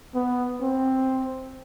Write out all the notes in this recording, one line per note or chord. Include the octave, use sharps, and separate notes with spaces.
B3
C4